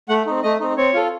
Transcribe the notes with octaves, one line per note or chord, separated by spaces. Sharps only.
A3 F#5
C4 D#4
A3 D#5
C4 D#4
C4 C#5
F4 A4